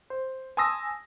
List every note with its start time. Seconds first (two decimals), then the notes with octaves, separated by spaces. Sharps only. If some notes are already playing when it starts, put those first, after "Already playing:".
0.10 C5
0.57 G#5 A5 C6 D#6 E6 A#6